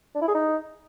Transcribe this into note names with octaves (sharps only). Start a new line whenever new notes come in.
D4
E4
G#4
D#4